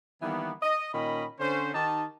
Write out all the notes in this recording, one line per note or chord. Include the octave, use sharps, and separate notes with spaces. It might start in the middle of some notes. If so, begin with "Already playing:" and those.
D#3 E3 G3 A#3 B3
D#5
A#2 D#3 C#4 D#5 B5
D3 C#4 C5
D#3 D#4 G4 A5